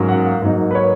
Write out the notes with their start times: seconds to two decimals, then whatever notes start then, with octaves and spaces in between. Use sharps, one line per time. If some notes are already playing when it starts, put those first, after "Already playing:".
Already playing: G#2 F#3 A#3 C#4
0.09 F#5
0.26 F5
0.42 G#2 F#3 A#3 D#4
0.71 B4
0.75 C#5